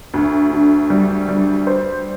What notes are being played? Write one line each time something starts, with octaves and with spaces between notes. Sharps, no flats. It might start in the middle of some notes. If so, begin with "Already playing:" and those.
D2
D3
G3
G3
C5